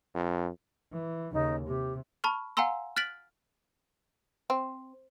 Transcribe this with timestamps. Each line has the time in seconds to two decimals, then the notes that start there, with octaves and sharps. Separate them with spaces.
0.15 F2
0.92 E3
1.33 D#2 C#3 D#4
1.66 C3 G4
2.24 A5 B5 C#6 F6
2.57 F5 F#5 G#5 A#5 C6 E6
2.96 F6 F#6 A6 B6 D7 F#7
4.50 C4